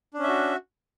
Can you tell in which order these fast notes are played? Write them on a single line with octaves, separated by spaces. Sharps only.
D4 C#4 E5 F#4